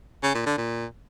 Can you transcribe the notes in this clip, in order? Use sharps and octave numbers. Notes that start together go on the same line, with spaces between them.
C#3
A#2
D3
A#2